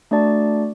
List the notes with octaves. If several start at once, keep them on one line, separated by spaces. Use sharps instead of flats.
A3 D4 F#4 D5 A5